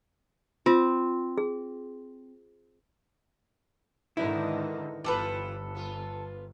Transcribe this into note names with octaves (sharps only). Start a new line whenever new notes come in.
C4 F4
G#4
G#2 D3 D#3 D#4 E4 A#4 B4
G1 E3 F4 G4 A4 B4
B3 F4